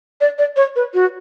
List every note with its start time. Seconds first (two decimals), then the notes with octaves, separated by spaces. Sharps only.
0.21 D5
0.38 D5
0.56 C#5
0.76 B4
0.94 F#4